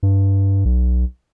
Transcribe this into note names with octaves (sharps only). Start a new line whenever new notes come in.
G2
B1